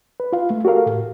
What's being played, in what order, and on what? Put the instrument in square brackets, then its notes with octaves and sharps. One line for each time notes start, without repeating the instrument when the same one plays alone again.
[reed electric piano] B4
F4 F5
A3
F#4 G4 A4 A#4 F5
A2